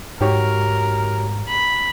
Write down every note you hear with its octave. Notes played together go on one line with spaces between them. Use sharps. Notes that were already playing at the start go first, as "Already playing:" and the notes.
G#2 F#4 G4 A#4 C#5
B5